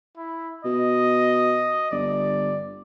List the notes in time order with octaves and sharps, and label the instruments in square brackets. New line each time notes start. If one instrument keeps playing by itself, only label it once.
[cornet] E4
[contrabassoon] B2 [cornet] D#5
[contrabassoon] G1 [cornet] D5